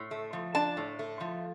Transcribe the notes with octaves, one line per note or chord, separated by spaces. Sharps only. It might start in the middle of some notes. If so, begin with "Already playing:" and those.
Already playing: A2
A3
F3
D4 A5
A2
A3
F3